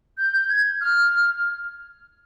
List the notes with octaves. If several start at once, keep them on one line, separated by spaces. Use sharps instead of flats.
G6
G6
G#6
F6